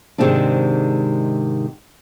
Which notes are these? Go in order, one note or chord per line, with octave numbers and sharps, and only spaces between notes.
G#2 C3 D#3 G#3 C4 D4